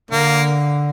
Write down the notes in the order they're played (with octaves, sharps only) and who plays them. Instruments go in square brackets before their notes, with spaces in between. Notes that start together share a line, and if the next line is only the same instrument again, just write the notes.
[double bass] D3 [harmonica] A#3